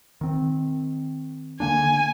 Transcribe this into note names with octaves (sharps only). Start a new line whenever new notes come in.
D#3 C4
D3 A#3 D4 G#5